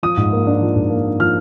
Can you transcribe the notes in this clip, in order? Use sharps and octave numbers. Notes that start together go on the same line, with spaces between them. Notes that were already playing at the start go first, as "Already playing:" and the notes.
F3 D#6
G#2
A#3
D4
F3
G#2
A#3
D4
F3 F6